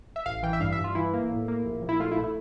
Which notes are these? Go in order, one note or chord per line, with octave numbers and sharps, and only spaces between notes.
E5
A1 F5
E3 G5
E5
G2 F5
E5
G2
F4
E3 E4
A#3
A2
A#3
A#1
A#1
E4
A3 F4
E4
A3
E4